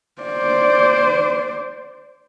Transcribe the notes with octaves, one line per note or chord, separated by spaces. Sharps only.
C5 D5